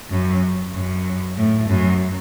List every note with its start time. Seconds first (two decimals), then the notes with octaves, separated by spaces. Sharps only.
0.10 F#2
0.73 F#2
1.37 A2
1.68 F#2